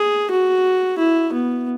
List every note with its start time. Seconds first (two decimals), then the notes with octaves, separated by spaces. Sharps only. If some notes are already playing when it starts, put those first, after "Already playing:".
Already playing: G#4
0.31 F#4
0.98 E4
1.33 B3